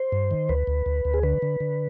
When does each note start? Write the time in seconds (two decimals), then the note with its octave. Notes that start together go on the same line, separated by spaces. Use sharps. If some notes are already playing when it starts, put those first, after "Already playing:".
Already playing: C5
0.12 G2
0.31 D#3
0.49 D2 B4
0.67 D2
0.86 D2
1.05 D2
1.14 G#4
1.23 D3 B4
1.42 D3
1.60 D3